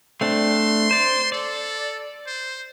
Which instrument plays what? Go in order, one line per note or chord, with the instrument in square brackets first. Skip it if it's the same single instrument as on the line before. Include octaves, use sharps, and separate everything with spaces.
[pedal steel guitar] A3 C4 D4 [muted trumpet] C6
[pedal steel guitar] C5 D5
[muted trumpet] A4 [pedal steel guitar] D5
[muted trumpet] C5